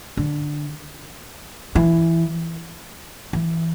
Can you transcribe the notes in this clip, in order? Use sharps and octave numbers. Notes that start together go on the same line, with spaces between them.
D3
E3
E3